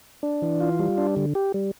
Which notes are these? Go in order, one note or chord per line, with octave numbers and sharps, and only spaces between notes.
D4
E3
F4
G3
D4
D3
G4
G3